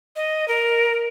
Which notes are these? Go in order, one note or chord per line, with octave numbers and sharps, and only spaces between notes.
D#5
A#4